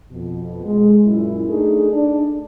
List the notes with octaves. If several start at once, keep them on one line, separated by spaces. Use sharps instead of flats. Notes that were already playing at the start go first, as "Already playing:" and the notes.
F2 B2
G#3
F#2 A#2 E4
A3 D4 D#4 G#4
D4